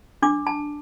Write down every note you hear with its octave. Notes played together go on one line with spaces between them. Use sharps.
D4 D6
A5